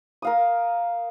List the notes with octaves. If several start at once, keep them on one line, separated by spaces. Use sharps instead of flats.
A#4 F5 D#6